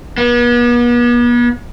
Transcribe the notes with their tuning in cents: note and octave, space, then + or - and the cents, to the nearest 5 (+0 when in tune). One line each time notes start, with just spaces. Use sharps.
B3 -40